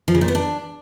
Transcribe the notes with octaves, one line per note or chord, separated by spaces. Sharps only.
F3
C#3
A#2
B3
D4